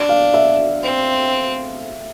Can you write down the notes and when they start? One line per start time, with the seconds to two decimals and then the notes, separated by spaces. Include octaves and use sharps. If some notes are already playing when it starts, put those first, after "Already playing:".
Already playing: D4
0.09 F5
0.34 E5
0.83 C4